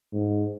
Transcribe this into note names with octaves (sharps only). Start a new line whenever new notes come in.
G#2